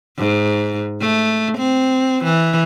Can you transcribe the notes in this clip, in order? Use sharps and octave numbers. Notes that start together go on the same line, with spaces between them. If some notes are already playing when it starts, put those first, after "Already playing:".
G#2
A3
C4
E3